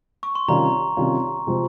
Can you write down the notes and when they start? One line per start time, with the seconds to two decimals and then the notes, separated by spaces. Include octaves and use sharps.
0.23 C#6
0.35 C6
0.48 C3 D#3 G3 C#4 F4 A#5
0.97 C3 D#3 G3 C#4 F4
1.47 C3 F3 G#3 C4